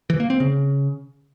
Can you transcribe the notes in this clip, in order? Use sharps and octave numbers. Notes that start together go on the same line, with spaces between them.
E3
A#3
C4
C#3